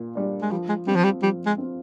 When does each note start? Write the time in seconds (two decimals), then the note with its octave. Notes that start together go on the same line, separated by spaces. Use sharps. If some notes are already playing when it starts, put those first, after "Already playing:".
Already playing: A#2
0.15 G3 D4
0.42 G#3
0.51 F3 G3
0.69 G#3
0.87 G3 C4 F4
0.96 F3
1.04 G3
1.22 F3 G3
1.46 G#3
1.58 C4 F4